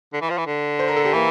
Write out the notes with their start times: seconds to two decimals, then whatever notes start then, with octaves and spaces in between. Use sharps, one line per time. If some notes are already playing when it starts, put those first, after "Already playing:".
0.13 D3
0.21 E3
0.30 F3
0.38 E3
0.47 D3
0.79 C5
0.88 A#4
0.96 A4
1.05 G4
1.13 E3 A#3